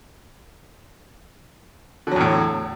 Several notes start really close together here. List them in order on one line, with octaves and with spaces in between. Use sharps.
D3 F#3 E2 A2